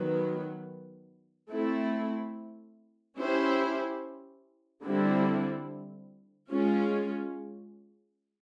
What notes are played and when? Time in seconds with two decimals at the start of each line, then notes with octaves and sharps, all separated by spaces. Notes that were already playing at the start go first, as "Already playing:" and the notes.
Already playing: D#3 F#3 B3
1.50 A3 C4 E4
3.16 C#4 E4 G4 C5
4.83 D3 G3 C4 E4
6.50 G#3 C#4 F4